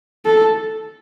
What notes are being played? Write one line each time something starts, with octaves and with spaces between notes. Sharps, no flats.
A4